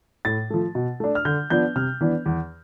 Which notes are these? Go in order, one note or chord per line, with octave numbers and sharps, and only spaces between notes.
A2 A6
F3 A3
B2
A3 D4
F6
D3 G6
F3 B3 D4 G6
C3 F6
E3 B3 D4
E2